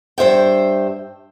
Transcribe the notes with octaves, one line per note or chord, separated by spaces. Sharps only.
G2 C5 E5 G5